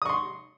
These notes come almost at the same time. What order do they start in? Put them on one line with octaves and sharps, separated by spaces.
D#6 C#6 C6